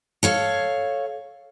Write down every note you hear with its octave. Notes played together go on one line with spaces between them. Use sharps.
A4 C#5 F5